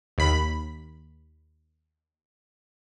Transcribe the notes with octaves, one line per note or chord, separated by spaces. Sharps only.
D#2 B5